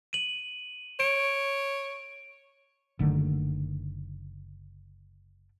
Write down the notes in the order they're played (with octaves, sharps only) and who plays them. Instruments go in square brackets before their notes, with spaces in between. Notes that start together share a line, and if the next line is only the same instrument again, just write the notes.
[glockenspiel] D#7 F#7
[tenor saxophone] C#5 [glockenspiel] D7
[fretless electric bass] F#1 D3 D#3 A3